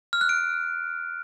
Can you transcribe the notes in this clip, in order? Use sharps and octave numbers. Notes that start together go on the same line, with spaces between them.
F6
F#6
D7